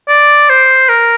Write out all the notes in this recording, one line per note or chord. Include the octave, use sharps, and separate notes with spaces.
D5
C5
A#4